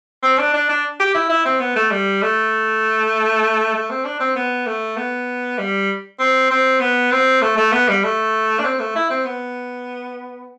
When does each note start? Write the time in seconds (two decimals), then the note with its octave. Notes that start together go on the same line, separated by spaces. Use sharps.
0.23 C4
0.38 D4
0.54 D4
0.69 D4
1.00 G4
1.14 E4
1.30 E4
1.45 C4
1.60 B3
1.76 A3
1.91 G3
2.22 A3
3.75 A3
3.90 C4
4.05 D4
4.20 C4
4.36 B3
4.66 A3
4.97 B3
5.58 G3
6.20 C4
6.51 C4
6.80 B3
7.12 C4
7.42 A3
7.57 A3
7.72 B3
7.88 G3
8.04 A3
8.59 D4
8.64 C4
8.80 A3
8.96 E4
9.11 C4
9.25 B3